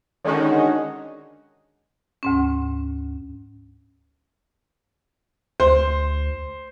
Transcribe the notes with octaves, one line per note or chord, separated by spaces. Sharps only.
D3 D#3 G#3 C#4 D#4 F#4
D2 G#2 C#4
D2 C5